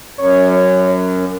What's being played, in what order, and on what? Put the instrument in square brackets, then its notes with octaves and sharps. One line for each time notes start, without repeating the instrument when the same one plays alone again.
[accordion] F#2 [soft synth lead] C#5